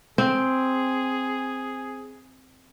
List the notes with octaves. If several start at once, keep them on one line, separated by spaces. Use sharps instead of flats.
C4 G#4